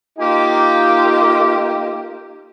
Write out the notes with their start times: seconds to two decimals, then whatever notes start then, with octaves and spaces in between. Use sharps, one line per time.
0.18 A#3 D#4 F4 G4